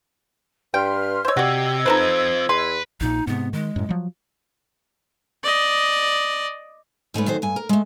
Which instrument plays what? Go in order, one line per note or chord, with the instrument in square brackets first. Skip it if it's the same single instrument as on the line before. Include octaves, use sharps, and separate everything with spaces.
[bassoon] G2 [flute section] B4 C6 F6 [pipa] G5
[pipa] C5 C#5 [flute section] D#5 E6 G#6
[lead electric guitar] C3 [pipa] F#4 D5 [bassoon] G4
[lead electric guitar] C4 F4 [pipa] D#4 A4 B4 [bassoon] C5
[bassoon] E2 [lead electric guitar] B4 [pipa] C6
[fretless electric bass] A#1 A#2 [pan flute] D#4
[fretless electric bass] G#2 C3 [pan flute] B3
[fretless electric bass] D#3 [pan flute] G#3
[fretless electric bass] F#2 A2
F3 F#3
[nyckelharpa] D5 D#5
[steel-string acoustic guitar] G#2 A3 C#4 B4
F#2 D#3 F#4 C5
G2 G#5
A#4
G#3 A3